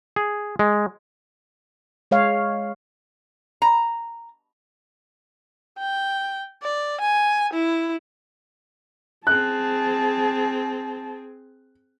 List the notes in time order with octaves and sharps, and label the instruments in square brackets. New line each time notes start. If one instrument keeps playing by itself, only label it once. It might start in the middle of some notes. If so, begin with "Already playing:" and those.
[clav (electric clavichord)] G#4
G#3
[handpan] G#3 C#5 F5
[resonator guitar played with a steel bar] A#5
[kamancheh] G5
D5
G#5
E4
[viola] C4 G#4 [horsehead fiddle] A5 [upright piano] F#6